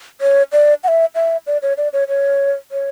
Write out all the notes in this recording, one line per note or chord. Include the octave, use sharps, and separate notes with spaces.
C#5
D5
F#5
E5
E5
D5
C#5
D5
C#5
C#5
C#5